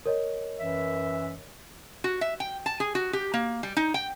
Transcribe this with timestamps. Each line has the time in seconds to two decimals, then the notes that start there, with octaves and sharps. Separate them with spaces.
0.06 A#4 C#5 D#5
0.60 F#2 E3 E5
2.04 F#4
2.21 E5
2.40 G5
2.66 A5
2.80 G#4
2.95 F#4
3.13 G4
3.34 A#3
3.63 G3
3.77 D#4
3.94 G5